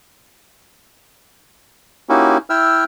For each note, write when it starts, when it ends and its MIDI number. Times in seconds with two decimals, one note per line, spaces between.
2.09 2.38 58
2.09 2.38 61
2.09 2.38 63
2.09 2.38 64
2.09 2.38 66
2.09 2.38 67
2.50 2.84 64
2.50 2.84 76
2.50 2.84 79
2.50 2.84 88
2.50 2.84 89